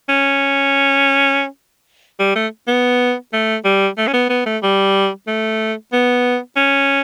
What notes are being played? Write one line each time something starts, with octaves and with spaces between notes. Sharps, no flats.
C#4
G3
A3
B3
A3
G3
A3
C#4
B3
B3
A3
G3
A3
B3
C#4